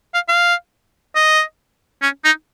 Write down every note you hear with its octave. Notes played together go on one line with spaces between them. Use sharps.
F5
F5
D#5
C#4
D#4